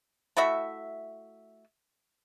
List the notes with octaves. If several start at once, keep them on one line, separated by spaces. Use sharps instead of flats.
A3 E4 F#4 E5